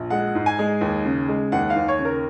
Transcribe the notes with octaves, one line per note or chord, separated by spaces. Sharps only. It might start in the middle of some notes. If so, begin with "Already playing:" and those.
Already playing: A#1
G#3 F#5
G#2
G#5
G#3
D#2
C#3
G#3
D#2 F#5
F5
D#2
C#5
C#3
A#4